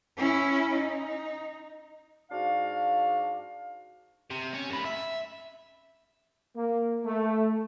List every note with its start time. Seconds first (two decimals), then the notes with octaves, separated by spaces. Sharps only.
0.17 C#4 E4
0.73 D#4
2.30 G#2 D4 F#4 F5
4.30 C3
4.54 C#4
4.70 F#2 B4
4.85 E5
6.56 A#3
7.05 A3